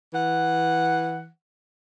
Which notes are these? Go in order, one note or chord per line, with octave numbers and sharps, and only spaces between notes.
E3 F#5